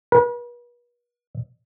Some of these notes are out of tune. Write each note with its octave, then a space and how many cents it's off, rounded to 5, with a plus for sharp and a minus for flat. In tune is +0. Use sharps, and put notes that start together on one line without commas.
B4 -40